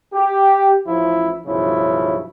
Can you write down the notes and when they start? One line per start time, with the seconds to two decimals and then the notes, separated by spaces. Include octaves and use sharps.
0.13 G4
0.86 A1 F3 E4
1.46 B1 G2 C#3 F3 C#4 E4